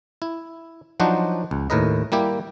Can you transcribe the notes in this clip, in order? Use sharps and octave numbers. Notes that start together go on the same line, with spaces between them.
E4
F3 F#3 D4 D#4 F#4 C5
C#2
D#2 A2 A#4 B4 D#5
G3 A#3 E4 G4